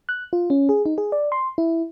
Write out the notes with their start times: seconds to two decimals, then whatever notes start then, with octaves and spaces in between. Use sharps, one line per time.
0.09 F#6
0.33 F4
0.50 C#4
0.69 G#4
0.86 D#4
0.98 G#4
1.12 D5
1.32 C6
1.58 E4